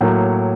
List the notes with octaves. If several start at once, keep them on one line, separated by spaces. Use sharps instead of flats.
A2 F#3 A#3